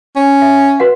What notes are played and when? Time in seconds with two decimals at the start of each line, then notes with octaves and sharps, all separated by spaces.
0.16 C#4
0.42 E5
0.80 F#4 B4 F#5